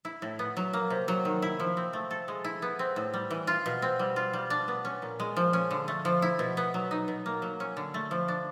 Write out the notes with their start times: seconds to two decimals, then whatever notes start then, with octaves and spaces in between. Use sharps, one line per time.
0.05 E4
0.22 A2
0.39 B3
0.57 F#3
0.73 A#3
0.90 C3
1.08 F#3
1.25 D#3
1.42 E4
1.60 F3
1.77 C4
1.93 A3
2.11 A4
2.28 G#3
2.44 E4
2.62 B3
2.79 C4
2.96 A2
3.14 G3
3.31 E3
3.47 F4
3.66 B2
3.82 C4
3.99 G3
4.16 F4
4.33 G3
4.50 D4
4.68 B3
4.85 C#4
5.02 A#2
5.20 G#3
5.36 F3
5.53 C#4
5.71 D3
5.88 A3
6.05 F3
6.22 E4
6.39 B2
6.57 B3
6.74 F#3
6.91 D#4
7.08 B2
7.26 A#3
7.42 F#3
7.60 C#4
7.77 D3
7.94 A3
8.11 F3
8.28 D4